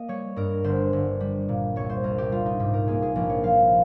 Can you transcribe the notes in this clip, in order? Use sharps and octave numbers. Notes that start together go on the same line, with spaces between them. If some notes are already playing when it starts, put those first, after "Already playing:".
Already playing: A#3 D#5
G3 C#5
G2 A#4
G1 C5
G1
G3
A#2
C2 C#5
C5
C2 A#4
G4
G3 F4
D#4
G#2 G4
A#4
A#3 G#4
G#4
A#1 A#4
C#5
F3 F5